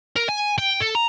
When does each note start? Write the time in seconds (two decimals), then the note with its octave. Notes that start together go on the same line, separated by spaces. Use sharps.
0.16 A#4
0.29 G#5
0.59 G5
0.80 A4
0.95 A#5